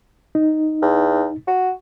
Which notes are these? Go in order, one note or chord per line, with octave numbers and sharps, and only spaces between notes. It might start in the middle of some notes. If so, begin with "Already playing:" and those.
D#4
E2
F#4